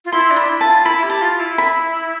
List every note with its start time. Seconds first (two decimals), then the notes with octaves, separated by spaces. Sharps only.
0.05 F4
0.12 E4 C6
0.31 D4
0.36 B5
0.49 E4
0.61 A5
0.67 F4
0.85 E4 B5
1.03 G4
1.10 A5
1.22 F4
1.40 E4
1.58 B5